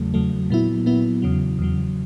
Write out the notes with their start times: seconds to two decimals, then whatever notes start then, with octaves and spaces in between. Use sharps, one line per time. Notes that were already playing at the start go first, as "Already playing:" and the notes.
Already playing: E2 C#3 F#3 A3
0.14 E2 C#3 F#3 A3
0.50 A#2 F#3 B3 E4
0.86 A#2 F#3 B3 E4
1.22 E2 C#3 F#3
1.59 E2 C#3 F#3